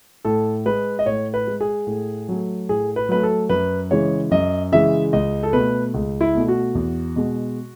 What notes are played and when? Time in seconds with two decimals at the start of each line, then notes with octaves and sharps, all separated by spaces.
0.25 A2 A4
0.66 G#3 B4
0.99 D#5
1.05 A2 C#5
1.34 B4
1.47 G#3
1.61 G#4
1.87 A2
2.29 F#3 A3
2.69 A2 G#4
2.96 B4
3.09 F#3 A3 B4
3.23 A4
3.49 F#2 B4
3.91 C#3 E3 G#3 C#5
4.31 F#2 D#5
4.72 C#3 E3 G#3 E5
5.13 C#2 D#5
5.43 A4
5.53 B2 A3 B4
5.94 C#2
6.21 E4
6.35 B2 A3
6.48 F#4
6.75 E2
7.16 B2 G#3